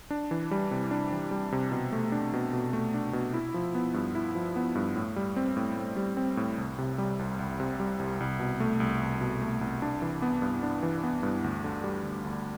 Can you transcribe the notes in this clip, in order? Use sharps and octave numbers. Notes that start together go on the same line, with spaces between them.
D4
E3
G3
C3
D4
E3
G3
C3
B2
A3
D4
B2
B2
A3
D4
B2
E4
F3
B3
G2
E4
F3
B3
G2
A2
G3
C4
A2
A2
G3
C4
A2
C2
C3
G3
C2
C2
C3
G3
C2
C2
B2
A3
C2
C2
B2
A3
C2
D4
E3
B3
G2
D4
E3
B3
G2
D2
D3
G3
D2
D2